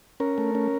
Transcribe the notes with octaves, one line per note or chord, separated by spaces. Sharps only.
C#4 A#4
A3
C#4